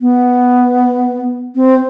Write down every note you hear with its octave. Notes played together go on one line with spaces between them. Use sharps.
B3
C4